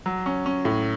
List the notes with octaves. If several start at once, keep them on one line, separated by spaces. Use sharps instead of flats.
F#3
C#4
C#4
A2